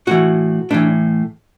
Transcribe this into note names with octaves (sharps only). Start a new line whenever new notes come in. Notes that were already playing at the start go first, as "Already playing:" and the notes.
A2 E3 F#4
A2 E3 D4